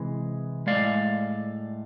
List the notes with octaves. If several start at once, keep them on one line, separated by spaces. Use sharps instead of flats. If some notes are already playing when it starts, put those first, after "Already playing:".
Already playing: C3 E3 G#3
A2 G#3 D5 F5